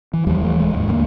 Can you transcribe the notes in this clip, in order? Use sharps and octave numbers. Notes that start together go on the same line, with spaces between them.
E3
D#2 F3 G3
E3 A3
D#1 G#3
A1 D#2 G#2
D2 F#3 A#3